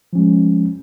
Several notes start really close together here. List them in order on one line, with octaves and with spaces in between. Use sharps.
F3 C#4 G#3